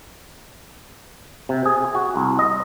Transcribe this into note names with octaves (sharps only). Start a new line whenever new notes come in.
C3
G#4
F#4
C2
D#5